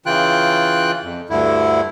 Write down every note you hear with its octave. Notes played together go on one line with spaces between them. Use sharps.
C#3 E3 F4 G5 F#6
F2
D2 G2 D3 E4